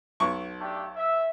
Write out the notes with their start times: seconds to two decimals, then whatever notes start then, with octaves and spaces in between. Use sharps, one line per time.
0.20 B1 C#6
0.60 A3 D4 G4
0.96 E5